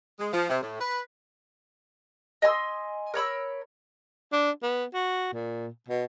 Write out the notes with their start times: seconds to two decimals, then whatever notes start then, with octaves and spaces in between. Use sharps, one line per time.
0.19 G#3
0.33 F3
0.49 C3
0.62 A2
0.80 B4
2.42 D#5 G#5 C6 E6
3.14 A#4 C#5 B5 E6
4.33 D4
4.63 B3
4.94 F#4
5.33 A#2
5.88 B2